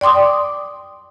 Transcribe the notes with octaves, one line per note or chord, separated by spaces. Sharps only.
D5 G5 C6 D6 D#6